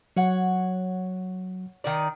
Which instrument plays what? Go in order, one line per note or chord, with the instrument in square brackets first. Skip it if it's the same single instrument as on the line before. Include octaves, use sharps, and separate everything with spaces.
[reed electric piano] F#3 [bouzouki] C#5 F#5
[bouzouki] D#3 D#4 D5